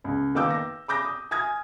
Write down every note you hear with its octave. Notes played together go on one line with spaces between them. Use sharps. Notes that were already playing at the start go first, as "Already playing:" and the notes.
C#2
D#3 A#3 B3 D6 E6 G6
A#6
B5 D6 G6 A#6
D#6
G#5 D#6 F6 G#6